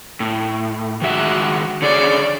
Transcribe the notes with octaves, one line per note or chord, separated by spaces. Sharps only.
A2
D#3 G#3 F#4 E5
D3 G#4 C#5 D5